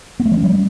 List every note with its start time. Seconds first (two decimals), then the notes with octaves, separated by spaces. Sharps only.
0.20 B3
0.25 A3
0.31 F3
0.37 C#4
0.43 G3